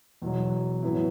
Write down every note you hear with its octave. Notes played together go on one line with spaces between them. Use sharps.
E2 B2 F#3
A2 F#3 B3 E4